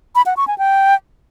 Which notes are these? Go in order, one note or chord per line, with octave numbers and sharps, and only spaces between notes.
B5
F#5
C#6
G#5
G5